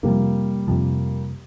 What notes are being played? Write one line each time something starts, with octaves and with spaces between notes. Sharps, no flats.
F2 C3 F3 G3 A#3
F2 C3 F3